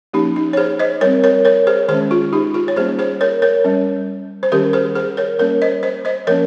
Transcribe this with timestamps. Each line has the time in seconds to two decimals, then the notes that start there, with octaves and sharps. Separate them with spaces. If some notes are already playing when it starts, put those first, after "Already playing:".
0.13 F3 A#3 C#4 D#4 G4
0.36 D#4
0.53 C#5
0.57 G#4 C5
0.79 C5 D#5
1.01 G3 C4 A#4 C#5
1.23 A#4 C#5
1.45 A#4 C#5
1.67 G#4 C5
1.88 D#3 G#3 C#4 G#4 C5
2.11 F4 G#4
2.33 D#4 G4
2.54 F4 G#4
2.68 C#5
2.76 G3 A#3 C#4 G#4 C5
2.99 G#4 C5
3.21 A#4 C#5
3.42 A#4 C#5
3.64 G3 C#4
4.43 C5
4.52 D#3 G3 C#4 G4 A#4
4.73 G#4 C5
4.95 G#4 C5
5.17 A#4 C#5
5.39 G3 A#3 C#4 A#4 C#5
5.62 C5 D#5
5.83 C5 D#5
6.05 C5 D#5
6.27 F3 A#3 C#4 A#4 C#5